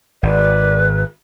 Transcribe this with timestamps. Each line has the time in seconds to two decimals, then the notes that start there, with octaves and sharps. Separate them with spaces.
0.23 G#1 B4 D5